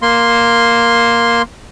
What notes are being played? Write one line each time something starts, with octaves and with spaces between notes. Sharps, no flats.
A#3 C6